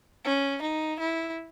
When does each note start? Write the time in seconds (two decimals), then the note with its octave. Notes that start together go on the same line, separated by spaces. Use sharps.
0.25 C#4
0.63 D#4
0.99 E4